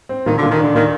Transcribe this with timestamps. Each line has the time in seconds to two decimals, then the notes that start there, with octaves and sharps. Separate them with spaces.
0.09 C4
0.26 A#2 D#3
0.38 D3
0.43 A#2
0.51 D#3
0.59 D3 D4
0.75 A#2 D#3